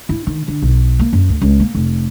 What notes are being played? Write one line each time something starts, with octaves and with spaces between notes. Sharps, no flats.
E4
D#3
D3
B1
A#3
F#2
D2
C#2
A#3
F1